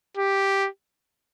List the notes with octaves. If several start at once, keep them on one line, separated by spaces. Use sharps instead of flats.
G4